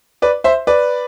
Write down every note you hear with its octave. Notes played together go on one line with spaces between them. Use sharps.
B4 D5
C5 E5
B4 D5